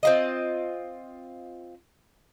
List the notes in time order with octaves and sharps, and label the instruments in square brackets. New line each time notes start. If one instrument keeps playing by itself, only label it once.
[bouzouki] C4 F4 D#5